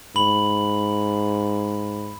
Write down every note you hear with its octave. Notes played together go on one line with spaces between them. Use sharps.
G#2 B5 F#7